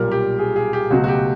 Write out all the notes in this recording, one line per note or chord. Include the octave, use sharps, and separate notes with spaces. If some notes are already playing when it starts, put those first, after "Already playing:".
Already playing: B1 A#2 G3 A#4
G4
G#4
G#4
G4
C#2 B2 F#3 A3 F#4
F#4
G4